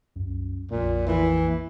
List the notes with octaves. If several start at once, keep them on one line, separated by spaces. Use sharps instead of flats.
C2 F#2
A#1 F2 A#2 A#3
E3